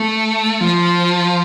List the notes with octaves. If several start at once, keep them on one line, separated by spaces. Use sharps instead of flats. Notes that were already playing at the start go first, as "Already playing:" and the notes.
Already playing: A3
F3